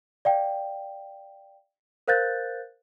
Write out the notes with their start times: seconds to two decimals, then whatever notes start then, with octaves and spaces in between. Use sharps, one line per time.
0.25 D5 F5 G5
2.08 A#4 C5 F5 F#6 G6 A6